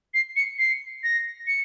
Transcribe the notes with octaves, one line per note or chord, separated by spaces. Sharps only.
C7
C#7
C7
A#6
C#7